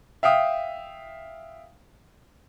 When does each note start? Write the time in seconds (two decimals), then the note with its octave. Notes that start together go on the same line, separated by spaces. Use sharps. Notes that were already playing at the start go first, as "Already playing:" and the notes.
0.23 E5 F5 G5 D#6